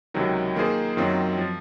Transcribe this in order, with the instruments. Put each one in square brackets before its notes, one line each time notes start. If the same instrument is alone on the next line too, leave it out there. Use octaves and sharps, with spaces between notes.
[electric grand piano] C#2 C3 D#3 F#3
D#3 A#3 F4 G#4 C5
F#2 D#3 F#3 C4 F4
F3